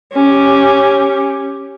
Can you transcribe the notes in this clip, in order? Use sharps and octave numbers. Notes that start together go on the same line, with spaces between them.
C#4 G4